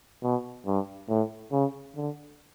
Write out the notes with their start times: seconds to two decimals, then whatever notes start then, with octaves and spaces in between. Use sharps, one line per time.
0.23 B2
0.66 G2
1.09 A2
1.52 C#3
1.96 D3